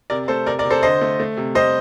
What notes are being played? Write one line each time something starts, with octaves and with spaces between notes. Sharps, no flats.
C3 A#4 D5
A3 A4 C5
C3 A#4 D5
A#4 D5
C3
A4 C5
D3 C5 D#5
A3
A3
C3
G3 C5 D#5